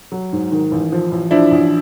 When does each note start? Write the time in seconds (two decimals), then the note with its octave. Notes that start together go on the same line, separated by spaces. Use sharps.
0.12 F#3
0.33 G#2
0.52 D#3
0.71 A1
0.92 F3
1.11 A1
1.31 F3 D4 E4
1.51 A1